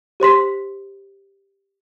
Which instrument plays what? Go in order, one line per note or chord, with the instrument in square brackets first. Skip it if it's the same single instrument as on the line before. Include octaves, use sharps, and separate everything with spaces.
[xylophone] G4 C5 C6 B6